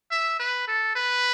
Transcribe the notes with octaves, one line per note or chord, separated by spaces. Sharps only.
E5
B4
A4
B4